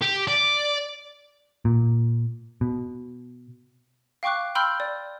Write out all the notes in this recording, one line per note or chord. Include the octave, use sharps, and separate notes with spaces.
G4
D5
A#2
B2
F5 G5 C#6 D6 F#6
G5 B5 C6 E6 F6 G6
D5